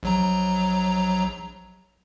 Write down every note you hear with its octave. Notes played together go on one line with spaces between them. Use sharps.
A#1 F#3 A#5